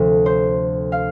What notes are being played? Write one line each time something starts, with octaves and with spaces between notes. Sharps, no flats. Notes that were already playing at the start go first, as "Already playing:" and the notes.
Already playing: D2 C3 F3 A4
C5
F5